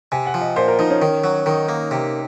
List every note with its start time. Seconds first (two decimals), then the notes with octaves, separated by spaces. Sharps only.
0.12 C3 G#5
0.27 F#5
0.34 F3
0.41 D#5
0.56 A#2 C5
0.68 A#4
0.79 F3 D#4
0.90 C#4
1.02 D#3
1.24 F#3
1.46 D#3 D#4
1.69 A#3
1.91 C3